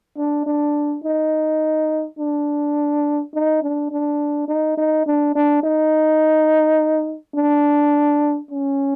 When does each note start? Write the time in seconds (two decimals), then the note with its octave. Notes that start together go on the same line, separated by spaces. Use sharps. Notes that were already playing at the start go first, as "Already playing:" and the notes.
0.18 D4
0.46 D4
1.04 D#4
2.19 D4
3.34 D#4
3.63 D4
3.92 D4
4.48 D#4
4.77 D#4
5.07 D4
5.35 D4
5.63 D#4
7.35 D4
8.51 C#4